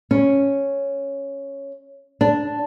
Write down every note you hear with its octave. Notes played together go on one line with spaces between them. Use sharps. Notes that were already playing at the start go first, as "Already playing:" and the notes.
C#4
D4